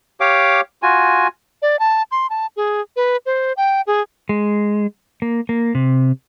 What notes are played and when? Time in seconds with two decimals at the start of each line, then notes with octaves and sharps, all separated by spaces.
0.20 G4 C#5 F5 D6
0.83 F4 F#4 G#5
1.62 D5
1.79 A5
2.11 C6
2.30 A5
2.56 G#4
2.96 B4
3.26 C5
3.57 G5
3.87 G#4
4.29 G#3
5.22 A#3
5.49 A#3
5.75 C3